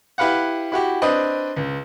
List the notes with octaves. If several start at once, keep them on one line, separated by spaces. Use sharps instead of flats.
E4 G4 B4 F5 F#5
E4 F#4 G4
C4 D4 B4 D#5
C#2